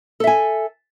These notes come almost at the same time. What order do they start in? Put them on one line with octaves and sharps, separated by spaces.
A4 E5 G#5